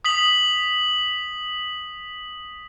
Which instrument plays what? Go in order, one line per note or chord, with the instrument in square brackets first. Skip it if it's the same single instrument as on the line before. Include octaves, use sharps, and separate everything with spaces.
[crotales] D#6 B6 F#7